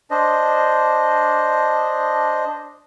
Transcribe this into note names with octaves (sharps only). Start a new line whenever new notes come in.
D4 C5 D#5